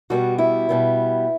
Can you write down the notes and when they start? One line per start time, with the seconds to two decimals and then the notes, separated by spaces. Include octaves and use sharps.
0.10 B2 G3 B3 F#4
0.38 E4
0.69 B2 G3 B3